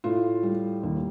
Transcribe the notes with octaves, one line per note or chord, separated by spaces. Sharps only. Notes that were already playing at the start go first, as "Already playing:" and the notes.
A2 F4
G3
D#2